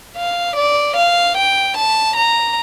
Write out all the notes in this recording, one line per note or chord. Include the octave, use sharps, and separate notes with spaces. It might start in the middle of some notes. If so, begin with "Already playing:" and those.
F5
D5
F5
G5
A5
A#5